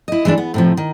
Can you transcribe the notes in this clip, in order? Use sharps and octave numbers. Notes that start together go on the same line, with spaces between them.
E4 D#5
E3 G#3 C4 D4
B3
A2 C3 F3
D#3